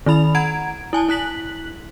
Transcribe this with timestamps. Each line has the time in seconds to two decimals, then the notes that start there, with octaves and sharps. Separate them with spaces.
0.06 D#3 E4 B5 F7
0.35 F#5 A#5 G#6 D7
0.93 E4 G#5 A5
1.09 E4 F#6 B6 F#7